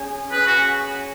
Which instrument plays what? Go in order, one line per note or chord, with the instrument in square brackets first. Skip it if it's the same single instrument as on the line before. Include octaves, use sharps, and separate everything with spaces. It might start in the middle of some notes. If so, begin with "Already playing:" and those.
Already playing: [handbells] C#4 G#4 C#5 G#5
[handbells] C#4 G#4 C#5 G#5 [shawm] B4
[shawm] F#4